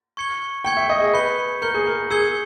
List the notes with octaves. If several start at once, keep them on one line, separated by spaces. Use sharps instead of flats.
C#6 G#6 C#7 G7
G5 C#6 G#6 C#7 G7
E5
D#5
G#4
B4 G6 C#7 G7
A#4 G6 C#7 G7
G#4
A#4
G#4 E6 G#6 C#7 G7